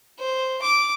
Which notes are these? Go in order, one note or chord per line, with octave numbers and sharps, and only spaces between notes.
C5
D6